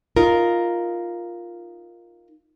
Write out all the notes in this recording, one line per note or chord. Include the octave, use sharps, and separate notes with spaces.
D#4 F4 A#4